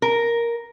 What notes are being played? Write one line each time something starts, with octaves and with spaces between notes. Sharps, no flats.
A#4